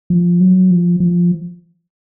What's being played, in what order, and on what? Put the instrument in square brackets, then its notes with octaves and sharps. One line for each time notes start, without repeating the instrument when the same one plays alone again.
[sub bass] F3
F#3
F3
F3